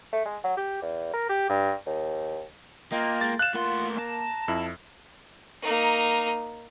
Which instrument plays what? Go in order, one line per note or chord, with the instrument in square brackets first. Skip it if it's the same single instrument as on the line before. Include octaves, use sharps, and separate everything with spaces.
[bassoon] A3
G#3
F#3
G4
E2
A#4
G4
G2
D#2
[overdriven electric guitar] A#3 [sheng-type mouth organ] F4 G5 A#5 [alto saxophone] D#5
[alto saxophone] G#3 [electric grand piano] A6
[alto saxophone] F5 [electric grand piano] F#6 E7 [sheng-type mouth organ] G6
[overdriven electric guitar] A2 C6 [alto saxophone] A#3 [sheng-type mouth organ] F4 F#5
[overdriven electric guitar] A5 [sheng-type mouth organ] A#5
[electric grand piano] F2 [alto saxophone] E4
[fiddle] A#3 D#4